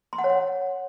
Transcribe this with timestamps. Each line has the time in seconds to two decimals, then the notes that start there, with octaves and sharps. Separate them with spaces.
0.13 C6
0.18 F#5
0.24 C#5
0.30 F#5